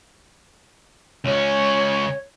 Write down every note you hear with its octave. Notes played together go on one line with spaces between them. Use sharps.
C#2 C#4 C#5